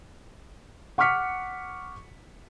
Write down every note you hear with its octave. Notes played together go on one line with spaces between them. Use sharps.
F#5 C#6 D6 F6 B6 C#7